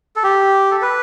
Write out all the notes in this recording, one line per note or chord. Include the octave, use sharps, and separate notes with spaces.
A4
G4
A4
B4